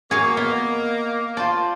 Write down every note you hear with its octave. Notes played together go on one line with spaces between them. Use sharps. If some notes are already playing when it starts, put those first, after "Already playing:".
A#3 F#4 G#4 C#5 F5
B3 D#5 B5
F4 C5 D5 A5